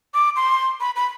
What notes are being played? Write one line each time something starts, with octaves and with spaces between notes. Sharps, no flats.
D6
C6
B5
B5